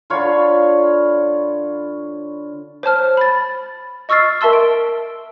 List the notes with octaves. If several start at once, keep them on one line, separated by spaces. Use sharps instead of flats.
D3 F4 C#5 B5
C5 C#5 A5 F6
B5 A6
D#5 C#6 E6 F6 A6 C7
A#4 E5 A5 C6 E6
D7